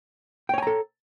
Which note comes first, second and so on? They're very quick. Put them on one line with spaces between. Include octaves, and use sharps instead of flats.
G5 C#5 G#5 A#5 A4